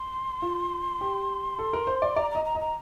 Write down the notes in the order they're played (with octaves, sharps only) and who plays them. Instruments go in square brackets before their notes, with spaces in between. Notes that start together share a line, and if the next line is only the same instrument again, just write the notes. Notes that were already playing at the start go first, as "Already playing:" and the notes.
Already playing: [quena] C6
[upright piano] F4
G4
A4
A#4
C5
D5
[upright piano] D5 [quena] A#5
[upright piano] D#5 [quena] A#5
[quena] A#5
[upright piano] D#5
[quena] A#5